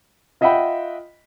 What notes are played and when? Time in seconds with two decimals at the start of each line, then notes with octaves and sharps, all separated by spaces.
0.41 F4 D#5 E5 F#5 G5 B5